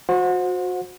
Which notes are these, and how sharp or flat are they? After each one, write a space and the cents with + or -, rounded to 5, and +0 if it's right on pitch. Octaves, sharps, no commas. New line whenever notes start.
F#4 -30 C5 +0 F#5 -35